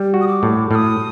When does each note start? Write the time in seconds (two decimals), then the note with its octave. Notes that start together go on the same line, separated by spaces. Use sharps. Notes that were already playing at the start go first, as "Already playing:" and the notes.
Already playing: G3
0.14 F#4
0.21 D#6
0.28 D6
0.43 A2
0.71 A2 F6
0.75 D#6